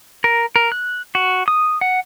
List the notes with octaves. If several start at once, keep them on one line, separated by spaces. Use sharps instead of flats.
A#4
A#4
F#6
F#4
D#6
F#5